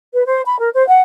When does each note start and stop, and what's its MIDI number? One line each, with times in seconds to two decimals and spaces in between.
0.14 0.25 71
0.26 0.40 72
0.45 0.58 83
0.59 0.69 70
0.73 0.84 72
0.88 1.01 78